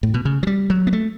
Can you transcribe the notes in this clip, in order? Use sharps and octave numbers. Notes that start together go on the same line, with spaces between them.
A2
B2
C#3
F#3
G3
F#3
B3
A3